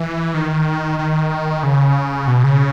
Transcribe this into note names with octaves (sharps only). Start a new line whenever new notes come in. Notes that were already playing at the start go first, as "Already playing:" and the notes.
Already playing: E3
D#3
D#3
C#3
B2
C#3